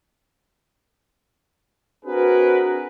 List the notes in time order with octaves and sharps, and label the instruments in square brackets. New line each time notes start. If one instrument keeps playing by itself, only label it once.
[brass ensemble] C4 D4 F#4 G#4 A#4 B4